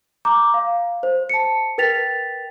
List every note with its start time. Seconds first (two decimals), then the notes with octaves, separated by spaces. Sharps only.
0.25 A#5 D6 G6
0.54 F5
1.03 C5
1.29 A5 C#7
1.78 A#4 B4 G5 A6 B6 F7